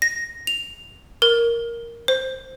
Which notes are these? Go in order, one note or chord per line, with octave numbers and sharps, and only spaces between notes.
A#6
F7
A#4
C5